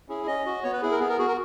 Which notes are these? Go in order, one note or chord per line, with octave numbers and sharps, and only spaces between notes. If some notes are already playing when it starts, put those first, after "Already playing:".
C#4 E4 G#4
C#4 D#5
F#4
B3 C#5
B4
E4 G#4
A#4
B3 G#4
A#4
F#4 G#4
A#4